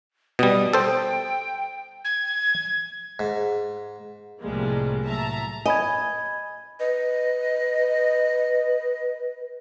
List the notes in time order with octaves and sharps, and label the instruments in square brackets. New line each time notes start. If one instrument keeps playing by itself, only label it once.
[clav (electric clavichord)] B2 G3 [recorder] D#6
[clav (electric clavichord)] A4 C5 [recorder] G5
[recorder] G#6
[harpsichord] G#2
[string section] C2 A2 F3 G3 G#3 A#3
A2 F#3 E5 A5 A#5
[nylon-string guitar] D#5 [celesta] G#5 B5 G#6
[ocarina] B4 [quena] D#5